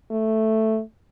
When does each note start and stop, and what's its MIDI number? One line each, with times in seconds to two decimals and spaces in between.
0.11 0.81 57